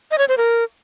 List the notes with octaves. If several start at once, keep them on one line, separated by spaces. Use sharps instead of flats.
D#5
C#5
C5
A#4